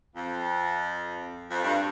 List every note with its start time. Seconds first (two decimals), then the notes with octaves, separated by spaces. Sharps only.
0.16 F2
1.51 F2
1.64 G2